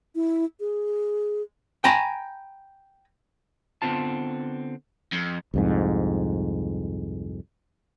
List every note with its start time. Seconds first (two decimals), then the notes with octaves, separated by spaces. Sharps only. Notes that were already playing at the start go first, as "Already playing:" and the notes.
0.15 E4
0.60 G#4
1.84 G5 G#5 A#5 B5
3.82 D3 B3 C4 F4 A5
5.12 F2
5.54 C2 F2 G#2